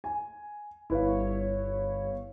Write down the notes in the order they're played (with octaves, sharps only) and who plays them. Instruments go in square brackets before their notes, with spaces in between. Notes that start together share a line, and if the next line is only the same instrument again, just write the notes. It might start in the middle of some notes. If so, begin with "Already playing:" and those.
[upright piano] G#5
[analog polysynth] G1 C#5 [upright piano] E4 B4 F5